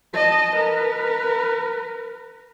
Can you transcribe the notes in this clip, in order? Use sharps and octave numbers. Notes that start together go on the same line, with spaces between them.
D#5 A5
A#4 B4